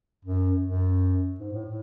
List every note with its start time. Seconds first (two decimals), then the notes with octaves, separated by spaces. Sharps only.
0.25 F#2
0.64 F#2
1.39 G#2
1.53 A2
1.65 A2